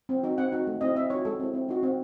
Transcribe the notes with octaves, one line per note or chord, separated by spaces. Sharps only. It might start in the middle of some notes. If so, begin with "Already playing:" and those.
C4
D#4 F#4
C4 F#5
D#4 F#4
A3
C4 E4 D#5
C4 E5
D#4 F#4 C#5
G#3 A4
C4 E4
C4
D#4 F#4
C4